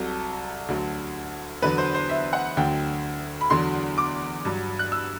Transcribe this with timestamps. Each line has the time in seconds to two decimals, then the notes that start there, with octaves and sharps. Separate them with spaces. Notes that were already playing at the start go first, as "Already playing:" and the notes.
Already playing: C2 C3 F#3 A4
0.68 D2 D3 F#3
1.62 E2 D3 F#3 B4
1.78 C5
1.94 C5
2.10 E5
2.33 F#5
2.57 D2 D3 F#3 G5
3.41 B5
3.50 E2 D3 F#3 C6
3.98 D6
4.45 G2 F#3
4.79 F#6
4.92 E6